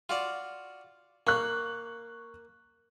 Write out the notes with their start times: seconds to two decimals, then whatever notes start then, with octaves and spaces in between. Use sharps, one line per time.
0.09 F4 F#4 D5
1.27 A#3 C#6 F#6